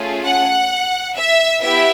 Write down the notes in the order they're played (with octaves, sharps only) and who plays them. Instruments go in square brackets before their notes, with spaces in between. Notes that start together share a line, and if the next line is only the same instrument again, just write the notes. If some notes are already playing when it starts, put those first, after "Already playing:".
Already playing: [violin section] A3 C#4 F4 G#4
F#5
E5
B3 E4 G4 E5